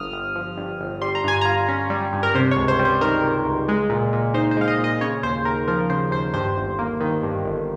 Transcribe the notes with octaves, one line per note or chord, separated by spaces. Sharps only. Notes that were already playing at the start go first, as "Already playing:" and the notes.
Already playing: G1 G2 D#6 F6
G1
F3
G2
G1
G3 C6
A#5
G2 G#5
F4 A#5
C#4
G3
G2
A#4
C3 C5
C#5
C#2
C5
G3
C5
D#3 A#4
C3
C#2
G#3
A#2
A#2
D#4 C5
C5
G#3 F5
D#5
A#2
D#5
C#3 C#5
D#2 C5
D#2 A#4
F3 A#4
C#3 C5
D#2 C5
G2 C5
G1
A#3
D#3
G2
G1